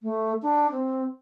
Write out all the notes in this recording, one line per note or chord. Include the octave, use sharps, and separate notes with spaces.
A3
D4
C4